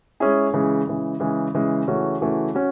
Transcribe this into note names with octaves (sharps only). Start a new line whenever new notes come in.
G#3 C#4 E4 G#4
C#3 E3 G#3
C#3 E3 G#3
C#3 E3 G#3
C#3 E3 G#3
C#3 E3 A3 C#4 F#4
C#3 E3 A3 C#4 F#4
C#4 F#4